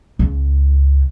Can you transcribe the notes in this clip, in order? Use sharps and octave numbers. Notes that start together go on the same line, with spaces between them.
C#2